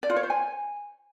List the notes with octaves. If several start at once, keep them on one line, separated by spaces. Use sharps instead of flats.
D5
F4
C#5
C5
G#5